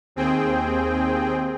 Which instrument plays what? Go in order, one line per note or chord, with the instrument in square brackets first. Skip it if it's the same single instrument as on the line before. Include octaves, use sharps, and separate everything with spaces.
[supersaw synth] D#2 C4 G#4 G5